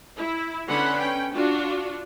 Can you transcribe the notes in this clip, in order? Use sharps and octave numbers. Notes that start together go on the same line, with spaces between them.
E4
D3 B3 C#4 F#5 B5 C6
C#4 G5
D4 F4 F#4